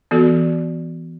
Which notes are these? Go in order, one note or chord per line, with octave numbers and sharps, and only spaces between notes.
E3 B3 F#4 A4 D5